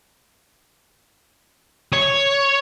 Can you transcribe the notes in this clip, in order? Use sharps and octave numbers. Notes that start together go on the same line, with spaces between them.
C#5